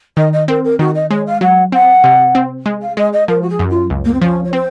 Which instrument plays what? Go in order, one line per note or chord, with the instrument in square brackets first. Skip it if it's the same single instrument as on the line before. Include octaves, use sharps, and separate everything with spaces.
[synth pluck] D#3 [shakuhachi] D#5
[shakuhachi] D#5
[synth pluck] C4 [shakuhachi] A#4
[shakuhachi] A#4
[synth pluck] D#3 [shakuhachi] F#4
[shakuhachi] D#5
[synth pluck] G#3 [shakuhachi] C#5
[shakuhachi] F5
[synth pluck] F#3 [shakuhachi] F#5
[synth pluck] C4 [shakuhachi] F#5
[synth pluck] C3
C4
G#3
[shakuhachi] F5
[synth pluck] G#3 [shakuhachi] D#5
[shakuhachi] D#5
[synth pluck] F3 [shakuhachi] A#4
[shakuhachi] F#4
G#4
[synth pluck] F#2
[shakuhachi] F4
[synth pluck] C#2
[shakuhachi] A#3
C4
[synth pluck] F3 [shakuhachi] C#4
[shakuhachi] C#5
[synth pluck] C4 [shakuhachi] C5